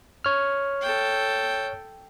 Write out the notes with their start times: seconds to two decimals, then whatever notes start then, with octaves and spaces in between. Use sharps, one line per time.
0.24 C#5 F6
0.81 A4 G5